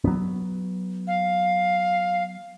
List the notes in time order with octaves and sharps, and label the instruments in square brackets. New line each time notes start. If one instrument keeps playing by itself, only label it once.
[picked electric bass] F#3 B3
[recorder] F5